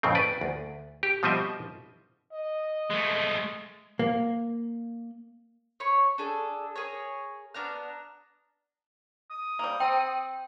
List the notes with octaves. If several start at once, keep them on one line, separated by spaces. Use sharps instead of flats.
F2 A2 C#3 C4
B4 D5
D2
G4
B2 F3 G3 C4 D#5 E5
D#5
G#3 A3
A#3
C#5 B5 C#6
D4 G#4 A4
G#4 A#4 C#5
B3 D4 A#5 F6
D#6
G3 A#3
C4 G5